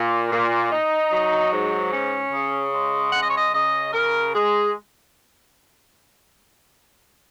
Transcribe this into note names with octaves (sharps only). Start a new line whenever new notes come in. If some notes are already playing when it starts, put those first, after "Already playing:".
Already playing: A#2
A#2
D#4
F#3
G#2
C#4
C#3
G#3
C#3 F#5
D#5
C#5
D#5
C#3 D#5
C#3 A#4
G#3 G#4